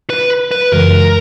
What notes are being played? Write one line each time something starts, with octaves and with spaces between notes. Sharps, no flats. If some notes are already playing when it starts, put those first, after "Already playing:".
B4
B4
F#2 C#3 E3 G#3 A#4